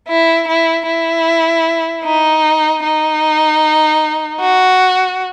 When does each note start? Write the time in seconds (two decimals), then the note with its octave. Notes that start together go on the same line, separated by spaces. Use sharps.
0.08 E4
0.48 E4
0.87 E4
2.04 D#4
2.84 D#4
4.40 F#4